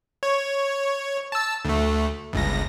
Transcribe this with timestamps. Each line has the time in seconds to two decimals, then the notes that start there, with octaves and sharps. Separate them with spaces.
0.23 C#5
1.32 A5 E6
1.65 D2 A3
2.33 G1 C#2 A#6